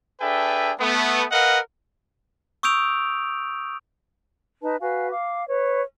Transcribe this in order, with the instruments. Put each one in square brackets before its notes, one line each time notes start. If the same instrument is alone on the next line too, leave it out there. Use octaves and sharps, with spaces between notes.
[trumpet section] D4 G#4 A4 B4 E5 G5
A3 B3
A#4 B4 D#5 F5 F#5
[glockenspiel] C#6 D#6 E6 G6 D7 F7
[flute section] D#4 B4 A5
F#4 B4 F5 G#5
F5 D6
B4 C#5